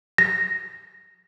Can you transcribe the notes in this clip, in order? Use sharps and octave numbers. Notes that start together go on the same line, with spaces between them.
A#6